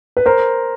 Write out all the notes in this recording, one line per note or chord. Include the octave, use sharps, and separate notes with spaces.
B4
A#4 C5